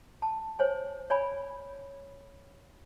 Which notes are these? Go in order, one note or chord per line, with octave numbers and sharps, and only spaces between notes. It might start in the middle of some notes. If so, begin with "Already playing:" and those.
A5
C5 C#5 G#5
C#5 D5 G#5 B5